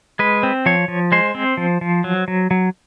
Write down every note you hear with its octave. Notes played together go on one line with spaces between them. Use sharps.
G#3 B4
C4
F3 C#5
F3
G#3 C5
C4
F3
F3
F#3
F#3
F#3